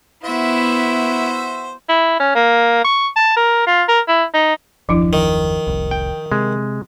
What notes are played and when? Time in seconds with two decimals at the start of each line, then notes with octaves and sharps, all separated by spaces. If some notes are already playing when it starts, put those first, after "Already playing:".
0.24 B3 E4 F#4 C5 E5
1.89 E4
2.20 C#4
2.35 A#3
2.84 C#6
3.16 A5
3.36 A#4
3.67 F4
3.88 A#4
4.08 E4
4.34 D#4
4.89 F#1 D#2 F3 D4 E4
5.13 D#3
5.67 F1 C2
5.91 G5
6.32 C3 G#3